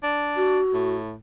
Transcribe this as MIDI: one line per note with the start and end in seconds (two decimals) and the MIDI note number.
0.03 0.60 62
0.36 0.95 66
0.74 1.15 45